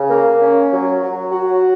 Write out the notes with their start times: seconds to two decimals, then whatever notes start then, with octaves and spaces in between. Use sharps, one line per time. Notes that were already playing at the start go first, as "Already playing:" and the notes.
Already playing: C#3
0.10 A#3
0.41 C#4
0.72 F#3
1.02 F#3
1.32 F#4